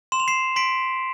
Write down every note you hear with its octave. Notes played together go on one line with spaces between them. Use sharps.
C6 E7
F7
C7 E7
C6 B6 D7